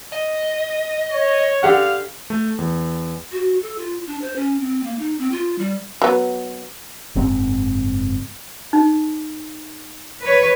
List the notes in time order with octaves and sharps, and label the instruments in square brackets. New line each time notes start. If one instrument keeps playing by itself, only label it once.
[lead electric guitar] D#5
[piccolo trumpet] C#5
[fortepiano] D3 G4 F#5 [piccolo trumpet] F5
[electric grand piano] A3
E2
[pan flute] F#4
A4
F4
D4
C5
C#4
C4
A#3
D#4
C4
F4
G3
[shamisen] F#3 B3
[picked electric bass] F#1 G#2 C4
[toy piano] D#4
[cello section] B4 C#5